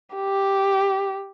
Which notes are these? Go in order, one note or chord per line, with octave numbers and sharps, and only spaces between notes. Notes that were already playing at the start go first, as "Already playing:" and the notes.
G4